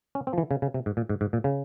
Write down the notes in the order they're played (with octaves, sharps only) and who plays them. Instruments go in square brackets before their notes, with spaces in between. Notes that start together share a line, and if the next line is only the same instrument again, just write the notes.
[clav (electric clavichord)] C#4
C4
F3
E3
C#3
C#3
C3
G#2
A#2
G#2
G#2
A#2
C#3